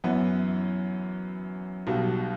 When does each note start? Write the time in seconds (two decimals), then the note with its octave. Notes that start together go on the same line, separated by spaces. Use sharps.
0.04 F#2 E3 B3
1.87 B1 B2 G3